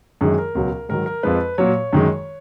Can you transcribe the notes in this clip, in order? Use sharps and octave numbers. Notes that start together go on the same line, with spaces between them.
F#2 D#3 G#3 G#4
A#4
C#2 B2 F#3
G#2 D#3 F#3 A#4
A#4
F2 F3 G#3 B4
A#2 F#3 C#5
F#2 D#3 G#3